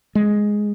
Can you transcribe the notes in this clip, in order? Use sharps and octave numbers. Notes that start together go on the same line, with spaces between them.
G#3